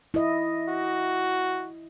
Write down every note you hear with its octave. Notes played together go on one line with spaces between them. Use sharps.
E4 D#5
F#4